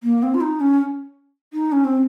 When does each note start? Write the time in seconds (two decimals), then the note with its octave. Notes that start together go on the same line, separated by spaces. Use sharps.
0.03 A#3
0.23 C4
0.34 F4
0.41 D#4
0.60 C#4
1.53 D#4
1.72 C#4
1.84 C4